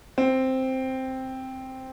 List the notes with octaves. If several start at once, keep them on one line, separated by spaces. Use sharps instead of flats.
C4